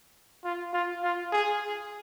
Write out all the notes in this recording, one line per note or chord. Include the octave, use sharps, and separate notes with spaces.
F4
F4
F4
G#4